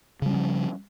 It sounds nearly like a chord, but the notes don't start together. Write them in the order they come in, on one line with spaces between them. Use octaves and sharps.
C#3 G3 C#4 F3